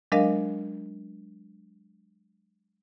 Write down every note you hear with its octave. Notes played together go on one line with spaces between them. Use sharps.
F#3 G#3 D4 A#4 D#5 F5